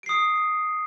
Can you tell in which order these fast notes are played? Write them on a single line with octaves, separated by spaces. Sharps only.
D7 C7 D#6